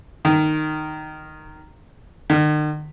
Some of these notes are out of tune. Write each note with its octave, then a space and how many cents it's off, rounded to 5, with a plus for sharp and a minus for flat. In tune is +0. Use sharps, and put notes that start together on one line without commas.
D#3 -10
D#3 -45